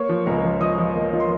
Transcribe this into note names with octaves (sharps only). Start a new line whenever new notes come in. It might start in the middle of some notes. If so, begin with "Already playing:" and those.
Already playing: A#3 C#5 C#6
F3
C#2 A#4 A#5
F3
F3 D#5 D#6
F3
A#3
F3
C6